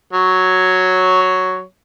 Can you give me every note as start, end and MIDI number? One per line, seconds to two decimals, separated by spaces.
0.13 1.62 54
0.13 1.62 73